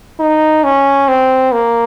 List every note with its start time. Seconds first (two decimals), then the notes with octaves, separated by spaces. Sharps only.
0.20 D#4
0.64 C#4
1.08 C4
1.52 A#3